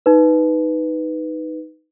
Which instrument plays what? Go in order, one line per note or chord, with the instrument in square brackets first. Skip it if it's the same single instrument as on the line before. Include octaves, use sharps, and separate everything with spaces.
[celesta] D#4 B4